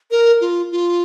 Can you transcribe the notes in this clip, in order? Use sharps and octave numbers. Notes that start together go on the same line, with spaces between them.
A#4
F4
F4